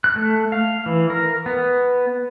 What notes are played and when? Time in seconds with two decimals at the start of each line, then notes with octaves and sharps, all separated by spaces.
0.04 F#6
0.16 A3
0.52 F5
0.86 E3
1.10 A#4
1.46 B3